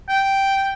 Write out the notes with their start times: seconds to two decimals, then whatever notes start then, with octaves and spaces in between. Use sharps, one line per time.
0.09 G5